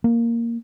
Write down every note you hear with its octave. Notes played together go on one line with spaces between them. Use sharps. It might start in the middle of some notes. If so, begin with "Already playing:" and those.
A#3